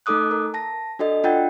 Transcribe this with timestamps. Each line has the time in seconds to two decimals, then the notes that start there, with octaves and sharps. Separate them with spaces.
0.06 A3 D#4 A4 D6 D#6 F#6
0.31 A#4
0.54 A5 A#6
0.99 D4 F#4 A4 D#5
1.24 D4 F4 F#5 G5 G6 A6